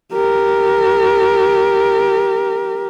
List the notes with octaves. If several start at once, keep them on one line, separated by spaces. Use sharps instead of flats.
G4 A#4